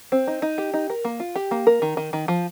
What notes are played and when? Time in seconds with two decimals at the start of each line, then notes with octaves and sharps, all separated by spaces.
0.12 C4
0.28 D#4
0.42 D#4
0.58 G4
0.74 D#4
0.90 A#4
1.05 A#3
1.20 F4
1.36 G4
1.51 A#3
1.67 A#4
1.82 D#3
1.97 D#3
2.13 D#3
2.28 F3